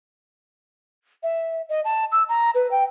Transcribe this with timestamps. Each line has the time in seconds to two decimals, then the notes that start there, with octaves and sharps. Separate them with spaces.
1.23 E5
1.69 D#5
1.85 A5
2.12 E6
2.29 A#5
2.55 B4
2.71 G5